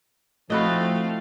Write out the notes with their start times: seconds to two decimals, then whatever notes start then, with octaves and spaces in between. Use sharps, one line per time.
0.50 F3 A3 C4 E4 F#4 D#5 F5